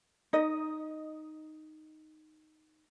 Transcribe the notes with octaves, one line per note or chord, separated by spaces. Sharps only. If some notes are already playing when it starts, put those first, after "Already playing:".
D#4 D#5